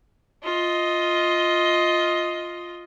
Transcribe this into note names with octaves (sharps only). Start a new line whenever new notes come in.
F4 D#5